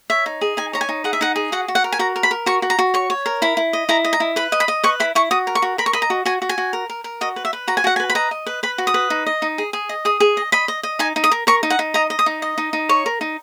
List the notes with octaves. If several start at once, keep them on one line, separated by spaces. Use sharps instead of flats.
C#5 E5
D#4
G#4
D#4 G#5
C#5 A#5
G#5
D#4
G#4 F#5
E5
D#4 F#5
G#4
F#4 F#5
F#4
F#5
A#4
G#5
F#4 A#5
A#4
B5
A#4
F#4 C#6
F#4
A#5
F#4
C#5 C#6
C#5
A#4
E4 B5
E4
D#5
E4 A#5
D#5
A#5
E4
B4 B5
D#5
B5
D#5
B4 C#6
E4 B5
E4 C#6
F#4 D#6
A#4
C#6
F#4
A#4 B5
C#6
D#5 B5
A#5
F#4
F#4 G#5
F#4
G#5
F#4
A#4
A#4
A#4
F#4 D#5
B4
E5
B4
F#4 A#5
G#5
F#4 F#5
G#5
B4
B5
D#5 A#5
D#5
B4
B4 B5
F#4
D#6
B4
D#4
D#5
D#4
G#4
G#4
D#5
G#4 D#6
G#4
D#5
D#5 B5
D#5
D#5
D#4 G#5
D#4
D#6
A#4
A#4 C#6
D#4
F#5
D#4
D#5 A#5
D#5
D#6
D#4
D#5
D#4
D#4
C#5 C#6
A#4
D#4